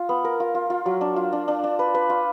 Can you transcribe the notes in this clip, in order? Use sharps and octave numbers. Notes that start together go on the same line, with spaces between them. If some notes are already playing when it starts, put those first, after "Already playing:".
Already playing: F4
B3
A#4
F4
F4
F4
F#3
D4
F4
D4
D4
D4
B4
B4
F4